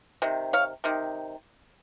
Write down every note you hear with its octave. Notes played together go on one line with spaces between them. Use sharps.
C3 D#3
C#5 F5
C3 D#3